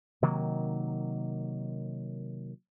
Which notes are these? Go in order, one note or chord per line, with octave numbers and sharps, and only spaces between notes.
C3 D#3 F#3 A#3